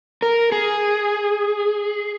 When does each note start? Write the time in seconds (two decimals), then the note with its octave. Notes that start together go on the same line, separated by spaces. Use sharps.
0.22 A#4
0.52 G#4